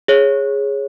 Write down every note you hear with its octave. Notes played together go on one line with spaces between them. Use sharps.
G#4 C#5